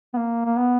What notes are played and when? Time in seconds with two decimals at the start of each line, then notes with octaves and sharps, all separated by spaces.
0.14 B3
0.17 A#3
0.45 A#3
0.58 B3